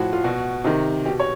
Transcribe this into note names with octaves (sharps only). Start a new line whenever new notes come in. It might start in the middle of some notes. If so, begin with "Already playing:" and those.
Already playing: A2 F3 F#4
F4
B2 F#4
C3 D#3
B2 G4
C#5